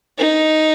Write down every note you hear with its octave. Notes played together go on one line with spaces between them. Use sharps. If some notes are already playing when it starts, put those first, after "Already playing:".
D#4